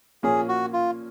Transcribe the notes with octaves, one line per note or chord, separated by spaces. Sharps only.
A#2 F3 A#3 C#4 G#4
F#4
F4